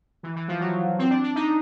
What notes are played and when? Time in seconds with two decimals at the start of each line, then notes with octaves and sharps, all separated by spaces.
0.23 E3
0.36 E3
0.48 F3
0.60 F#3
0.99 C4
1.10 D4
1.24 D4
1.35 D#4